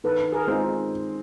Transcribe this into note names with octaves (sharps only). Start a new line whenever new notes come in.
D#3 A4 B4
G#4 A#4
G#3 C4 D#4 F4